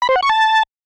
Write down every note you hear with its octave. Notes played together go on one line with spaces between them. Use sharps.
B5
C5
F#5
C#6
A5